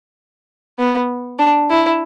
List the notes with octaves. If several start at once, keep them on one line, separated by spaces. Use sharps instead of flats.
B3
D4
E4